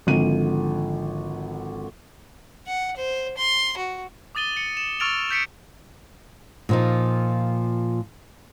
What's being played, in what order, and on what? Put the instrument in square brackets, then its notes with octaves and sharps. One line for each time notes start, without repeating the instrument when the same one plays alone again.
[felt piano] G#1 D3 F3 D#7
[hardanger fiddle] F#5
C5
C6
F#4
[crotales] D6 D#6 A6 D#7 G7
C#7
E7
C#6 E6 F6 A6 D7 F7
G6 B6 C#7 D7
[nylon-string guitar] A#2 F3 D#4